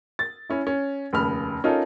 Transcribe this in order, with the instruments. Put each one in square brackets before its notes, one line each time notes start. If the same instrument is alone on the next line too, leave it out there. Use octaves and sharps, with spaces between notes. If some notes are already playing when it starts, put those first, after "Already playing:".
[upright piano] A6
C#4 E4
C#4
F1 D#2 C#3 B5 F6
C#4 D#4 F4 A4 A#4